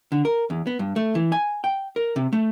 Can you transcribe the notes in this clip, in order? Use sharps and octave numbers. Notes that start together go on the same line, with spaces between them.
D3
A#4
E2
B3
G2
A3
E3
G#5
G5
A#4
C3
A3